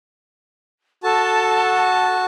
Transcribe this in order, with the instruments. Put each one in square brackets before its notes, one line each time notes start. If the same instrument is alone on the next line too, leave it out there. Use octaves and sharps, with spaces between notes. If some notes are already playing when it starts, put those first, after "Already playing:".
[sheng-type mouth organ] F#4 A5 [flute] A4